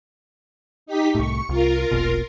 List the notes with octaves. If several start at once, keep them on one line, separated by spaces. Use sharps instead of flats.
D#4 G4 B6
C2 A2 C#6
C2 F4 A#4
E1 A#1 B2